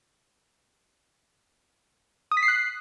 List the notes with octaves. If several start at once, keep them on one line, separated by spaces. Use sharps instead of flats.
D#6
B6
C7
F#6